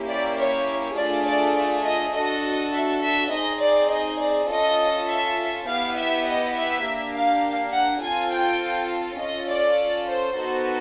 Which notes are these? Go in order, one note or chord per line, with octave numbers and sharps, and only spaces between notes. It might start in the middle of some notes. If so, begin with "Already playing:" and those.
Already playing: A#3 C#4 E4 G4
D5
C#5
A3 D4 F4 G#4 D5
D5
D5
D#5
D4 F#4 A4 D#5
E5
E5
C4 D#4 G#4 D#5
D5
D#5
D5
C#4 F4 A4 D#5
E5
B3 E4 G4 F5
E5
D#5
E5
A#3 D4 G4
F5
F#5
C4 F4 A4 G#5
G5
C#4 F4 A4 D#5
D5
C5
B3 D#4 F#4 A4